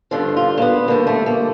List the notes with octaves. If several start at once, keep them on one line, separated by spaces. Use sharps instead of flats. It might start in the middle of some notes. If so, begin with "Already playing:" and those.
G2 D3 F3 F4
F4
A#3
B3
G2 D3 F3 A#3
A3
A#3